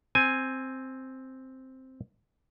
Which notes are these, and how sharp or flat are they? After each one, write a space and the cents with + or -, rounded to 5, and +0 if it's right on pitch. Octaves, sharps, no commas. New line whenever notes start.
C4 +0 G#5 +0